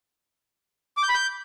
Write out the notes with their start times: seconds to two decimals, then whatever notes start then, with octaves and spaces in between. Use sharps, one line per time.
0.97 D6
1.03 G6
1.09 B5
1.15 G6